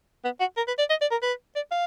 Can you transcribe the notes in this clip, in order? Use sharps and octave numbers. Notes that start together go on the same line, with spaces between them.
B3
F#4
A#4
B4
D5
D#5
D5
A#4
B4
D5
F5